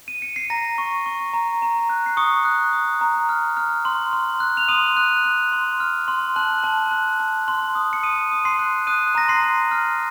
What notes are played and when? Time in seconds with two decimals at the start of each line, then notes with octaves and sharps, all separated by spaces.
0.08 D#7
0.22 C#7
0.36 C7
0.50 A#5 A#6
0.78 C#6
1.06 C#6
1.33 A#5
1.62 A#5
1.90 F#6
2.06 C7
2.17 C#6 D#6 C#7
2.45 F#6
2.73 D#6
3.01 A#5
3.29 F6
3.57 F6
3.85 C6
4.13 C6
4.40 F#6
4.57 F7
4.68 C6 D#6 D#7
4.97 F#6
5.24 F#6
5.52 C6
5.80 F6
6.08 C6
6.36 A5 F#6 F#7
6.64 A5
6.91 F#6
7.20 A5
7.48 C6
7.75 D#6
7.93 C#7
8.03 D#6 D#7
8.32 D#6
8.45 C6 C7
8.59 F#6
8.87 D#6 F#6 D#7
9.15 A#5 A#6
9.28 C6 C7
9.43 A#5
9.71 F6